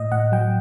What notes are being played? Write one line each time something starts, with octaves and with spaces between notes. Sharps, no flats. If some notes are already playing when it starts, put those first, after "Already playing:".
Already playing: A2 D#5
A2 F#5
F#3 G5